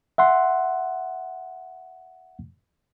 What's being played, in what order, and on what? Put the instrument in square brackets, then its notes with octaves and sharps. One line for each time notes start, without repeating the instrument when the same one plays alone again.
[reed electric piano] E5 F#5 C6